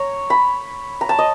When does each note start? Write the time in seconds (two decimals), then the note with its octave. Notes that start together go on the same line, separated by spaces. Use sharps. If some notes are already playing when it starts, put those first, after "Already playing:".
Already playing: C#5 A#5
0.30 B5
1.01 A#5
1.09 A5
1.19 D#5